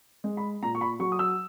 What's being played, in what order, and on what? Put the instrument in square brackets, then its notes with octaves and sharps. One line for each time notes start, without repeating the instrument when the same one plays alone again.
[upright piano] G#3
B5
A#2 A#5
C#6
B5
F#3 C#6
D#6
E6